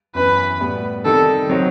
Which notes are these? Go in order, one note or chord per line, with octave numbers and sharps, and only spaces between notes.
F#2 E3 B3 B4
A2 G3 B3
C3 D#3 G3 A4
F#3 C4 D#4 F#4